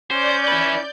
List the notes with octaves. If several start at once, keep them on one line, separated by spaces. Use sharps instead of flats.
C#4 C5 D5 G6
E4 B4